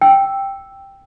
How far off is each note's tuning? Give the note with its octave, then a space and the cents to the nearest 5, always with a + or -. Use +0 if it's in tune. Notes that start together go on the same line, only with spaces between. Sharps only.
G5 +0 E6 +0